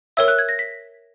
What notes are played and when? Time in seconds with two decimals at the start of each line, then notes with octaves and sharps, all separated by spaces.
0.17 A#4 C#5 E5 E6
0.28 F#6
0.38 G#6
0.49 A#6
0.59 B6